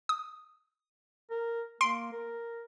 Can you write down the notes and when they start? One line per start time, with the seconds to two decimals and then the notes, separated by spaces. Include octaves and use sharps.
0.09 D#6
1.30 A#4
1.81 A#3 C6 C7 D7
2.12 A#4